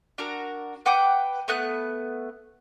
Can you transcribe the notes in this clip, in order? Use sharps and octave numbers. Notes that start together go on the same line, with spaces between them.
D4 F#4 A#4
B4 F#5 G5 D6
A3 B3 F#6